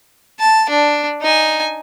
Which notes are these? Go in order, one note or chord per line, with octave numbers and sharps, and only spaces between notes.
A5
D4
D#4 G#5